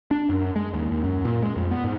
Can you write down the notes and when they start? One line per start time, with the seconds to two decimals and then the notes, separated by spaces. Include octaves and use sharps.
0.11 D4
0.29 F#2
0.56 G#3
0.74 D#2
0.91 D#2
1.04 F#2
1.25 A#2
1.43 G#3
1.56 F2
1.71 B3
1.84 G#2